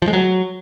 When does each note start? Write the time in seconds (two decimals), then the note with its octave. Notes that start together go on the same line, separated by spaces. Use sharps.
0.02 F3
0.08 G#3
0.13 F#3